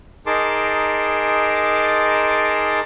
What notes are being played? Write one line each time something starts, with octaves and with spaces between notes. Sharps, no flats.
D#4 G#4 A#4 A5 C6 D6